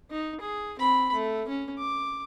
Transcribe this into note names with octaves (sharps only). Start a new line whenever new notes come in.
D#4
G#4
C4 B5
A3
C#4
D6